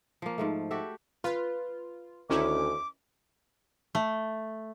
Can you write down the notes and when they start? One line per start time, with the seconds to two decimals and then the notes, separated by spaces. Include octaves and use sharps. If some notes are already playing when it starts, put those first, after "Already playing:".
0.22 F3 A#3
0.38 G#2 F3 A3
0.71 F#4 G4 A4 E5
1.24 F4 B4
2.30 D2 D#3 C#4 E4 D6
3.95 A3